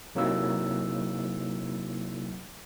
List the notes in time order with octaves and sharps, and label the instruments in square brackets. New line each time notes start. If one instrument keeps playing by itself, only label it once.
[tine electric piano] C3 F#3 A#3 D#4 E4 E6